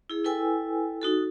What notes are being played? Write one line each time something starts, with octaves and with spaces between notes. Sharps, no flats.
E4 G#4
E4 A4 B4 G5 G#5 E6
D#4 F#4 A4